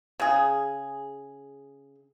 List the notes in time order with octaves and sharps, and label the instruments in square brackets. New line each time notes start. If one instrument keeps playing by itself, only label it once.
[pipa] C#3 G#4